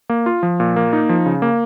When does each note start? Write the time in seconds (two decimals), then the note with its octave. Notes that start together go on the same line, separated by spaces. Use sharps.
0.09 A#3
0.26 F4
0.43 F3
0.60 A#2
0.76 A#3
0.93 D#4
1.09 F3
1.26 C#3
1.42 A#3